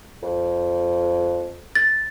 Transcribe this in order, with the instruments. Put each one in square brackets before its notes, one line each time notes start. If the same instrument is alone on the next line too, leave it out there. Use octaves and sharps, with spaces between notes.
[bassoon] F2
[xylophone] A6